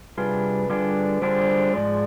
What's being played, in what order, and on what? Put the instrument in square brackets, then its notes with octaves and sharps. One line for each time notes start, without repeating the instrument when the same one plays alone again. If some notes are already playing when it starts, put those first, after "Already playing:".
[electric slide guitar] C3 G3 D4 F4 G#4 [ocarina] B4
[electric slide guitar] D3 G3 D4 F4 G#4
[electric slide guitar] D3 G3 D4 F4 G#4 [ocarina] C5
[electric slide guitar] G#2 F3 G#3 [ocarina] D5